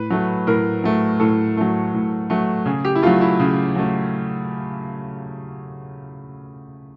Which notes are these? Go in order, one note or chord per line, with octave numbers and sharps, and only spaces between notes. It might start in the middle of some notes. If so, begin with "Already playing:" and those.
Already playing: A2 B4
F#3 A3
A2 A#4
F#3 A3
A2 A4
F#3 A3
A2
F#3 A3
C#3 G#4
G4
E4
F#3 A3 F4
E4
C#3
F#3 A3